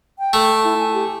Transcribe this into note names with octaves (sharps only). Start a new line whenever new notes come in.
G5
A3
E4
G#5
G4